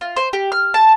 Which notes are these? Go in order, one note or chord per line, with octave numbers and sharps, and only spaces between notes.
F4
C5
G4
F6
A5